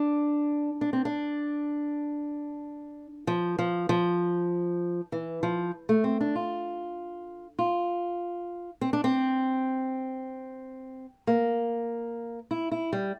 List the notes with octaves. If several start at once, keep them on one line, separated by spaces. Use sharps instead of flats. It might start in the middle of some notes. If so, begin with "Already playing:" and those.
Already playing: D4
D4
C4
D4
F3
F3
F3
E3
F3
A3
C4
D4
F4
F4
C4
D4
C4
A#3
E4
E4
G3